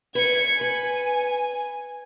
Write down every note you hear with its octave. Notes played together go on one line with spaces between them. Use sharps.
B4 G#6 C#7
B4 G#5